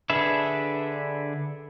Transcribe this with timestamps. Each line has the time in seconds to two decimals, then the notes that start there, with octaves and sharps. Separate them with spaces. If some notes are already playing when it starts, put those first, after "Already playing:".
0.10 D3 D4 G#4 B4 E5